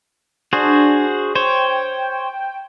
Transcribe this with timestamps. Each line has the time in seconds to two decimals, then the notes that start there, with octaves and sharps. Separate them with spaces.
0.53 D4 F#4 G#4 C5
1.35 C5 C#5 G5